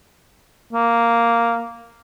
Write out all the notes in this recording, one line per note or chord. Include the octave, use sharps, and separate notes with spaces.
A#3